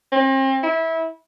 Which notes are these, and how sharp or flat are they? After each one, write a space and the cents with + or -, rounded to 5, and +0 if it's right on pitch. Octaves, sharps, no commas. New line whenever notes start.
C4 +40
E4 -20